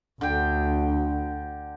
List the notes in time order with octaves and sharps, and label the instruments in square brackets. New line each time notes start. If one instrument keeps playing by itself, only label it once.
[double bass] D2 [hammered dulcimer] D3 G5